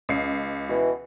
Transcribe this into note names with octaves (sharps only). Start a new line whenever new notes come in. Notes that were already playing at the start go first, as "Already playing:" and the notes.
C#2 C7
B2 E3